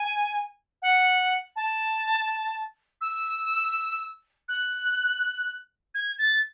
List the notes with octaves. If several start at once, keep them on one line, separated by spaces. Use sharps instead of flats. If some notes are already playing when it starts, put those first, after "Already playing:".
Already playing: G#5
F#5
A5
E6
F#6
G#6
A6